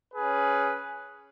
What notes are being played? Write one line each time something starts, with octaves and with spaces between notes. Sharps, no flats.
C#4 G#4 B4